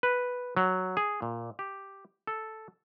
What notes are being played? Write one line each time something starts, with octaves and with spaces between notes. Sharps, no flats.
B4
F#3
G#4
A#2
G4
A4